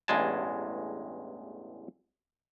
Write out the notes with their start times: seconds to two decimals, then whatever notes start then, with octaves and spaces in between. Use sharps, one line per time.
0.08 A1 E2 G2 G#3 G#5 A5